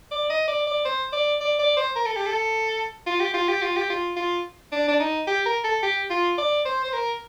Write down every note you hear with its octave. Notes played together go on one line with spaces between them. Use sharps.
D5
D#5
D5
D5
C5
D5
D5
D5
C5
A#4
A4
G4
A4
F4
G4
F4
G4
F4
G4
F4
F4
D4
D4
D#4
G4
A#4
A4
G4
F4
D5
C5
C5
A#4